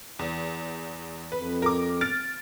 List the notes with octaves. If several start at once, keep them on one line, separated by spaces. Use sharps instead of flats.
E2
F2 B4
A#4 D6
F6 A6 D7